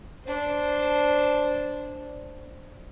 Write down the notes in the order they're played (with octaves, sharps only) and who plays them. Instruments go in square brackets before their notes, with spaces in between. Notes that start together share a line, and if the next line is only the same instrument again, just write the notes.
[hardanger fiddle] D4 C5